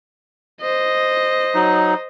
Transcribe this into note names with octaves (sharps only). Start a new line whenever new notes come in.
C5 D#5
F#3 D#4